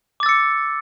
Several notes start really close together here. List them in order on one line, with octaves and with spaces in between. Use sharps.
D6 A6 E6 C#7